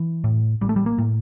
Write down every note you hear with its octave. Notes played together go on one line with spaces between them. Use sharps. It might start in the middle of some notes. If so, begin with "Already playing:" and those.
Already playing: E3
A2
A1 G3
A3
G3
A#3
A2